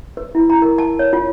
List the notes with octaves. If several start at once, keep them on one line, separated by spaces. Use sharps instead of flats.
B4
E4
A#5
A#4
A5
C#5
F4